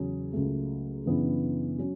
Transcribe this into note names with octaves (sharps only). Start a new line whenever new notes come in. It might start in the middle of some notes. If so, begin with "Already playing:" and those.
Already playing: E2 C#3 F#3 C#4 G#4
C#2 C#3 F#3 A3
F#2 C#3 E3 B3 D4
F#3 C#4